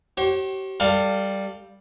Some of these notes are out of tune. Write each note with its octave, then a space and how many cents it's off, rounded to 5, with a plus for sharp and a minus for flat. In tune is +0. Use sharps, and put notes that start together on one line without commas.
G4 -40 C#5 -45
G3 +0 A4 +35 F5 +0